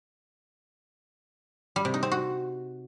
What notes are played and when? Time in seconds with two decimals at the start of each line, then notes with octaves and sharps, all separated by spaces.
1.76 G3
1.85 C3
1.94 D#4
2.03 C4
2.12 F#4